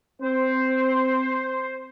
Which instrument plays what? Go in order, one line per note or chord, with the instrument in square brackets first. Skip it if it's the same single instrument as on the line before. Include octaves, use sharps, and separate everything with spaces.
[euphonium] C4 [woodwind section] C5